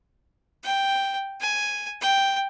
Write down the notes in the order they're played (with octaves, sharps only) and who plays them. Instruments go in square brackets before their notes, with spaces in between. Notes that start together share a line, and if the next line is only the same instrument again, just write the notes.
[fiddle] G5
G#5
G5